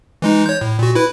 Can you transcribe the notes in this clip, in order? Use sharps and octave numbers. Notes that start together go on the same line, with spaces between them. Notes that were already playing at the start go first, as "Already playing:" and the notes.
E3 G#3 D#4
C#5 G6
A2
A#2 F#4
E4 B4